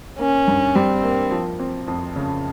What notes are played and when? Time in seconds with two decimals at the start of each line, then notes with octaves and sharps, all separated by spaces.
0.19 A#3 C#4
0.48 G2
0.75 G3 C4
1.03 A#3
1.31 F3
1.60 C4
1.88 F2
2.16 C#3